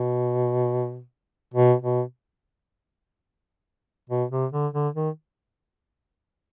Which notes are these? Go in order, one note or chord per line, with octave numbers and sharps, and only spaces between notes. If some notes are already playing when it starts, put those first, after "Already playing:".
Already playing: B2
B2
B2
B2
C3
D3
D3
D#3